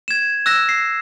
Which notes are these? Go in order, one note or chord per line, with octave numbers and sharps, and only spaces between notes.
G#6 E7
E6 F#6 A#6 E7
C7